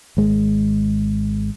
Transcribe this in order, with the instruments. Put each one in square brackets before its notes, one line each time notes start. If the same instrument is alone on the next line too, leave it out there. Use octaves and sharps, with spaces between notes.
[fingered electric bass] G#1 G#3